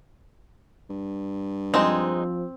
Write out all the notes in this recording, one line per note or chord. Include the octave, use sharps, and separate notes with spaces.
G2
F3 G#3 C4 D#4